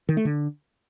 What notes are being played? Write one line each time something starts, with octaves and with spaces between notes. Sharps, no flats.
D#3
A3
D3